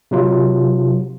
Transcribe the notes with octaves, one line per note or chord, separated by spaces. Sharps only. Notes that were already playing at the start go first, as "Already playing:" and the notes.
C3 F#3 F4